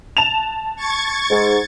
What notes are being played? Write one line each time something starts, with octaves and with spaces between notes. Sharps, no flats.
A5 E7 F7
C#6 G#6 A6
G#2